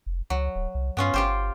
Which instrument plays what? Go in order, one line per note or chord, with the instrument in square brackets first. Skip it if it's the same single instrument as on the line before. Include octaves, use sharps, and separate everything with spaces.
[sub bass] F1
[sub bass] C#2 [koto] F#3
[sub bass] D1
C2
[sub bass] G2 [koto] B3 C#4 F4
[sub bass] G1 [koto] F4 G4 C5